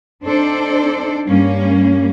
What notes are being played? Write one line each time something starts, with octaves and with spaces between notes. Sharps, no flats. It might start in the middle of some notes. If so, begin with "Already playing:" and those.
C4 D4 D#4 A4 C5 D5
G2 G3 A#3 C#4